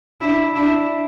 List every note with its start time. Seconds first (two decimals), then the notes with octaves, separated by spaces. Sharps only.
0.21 D4 E4
0.55 D4 E4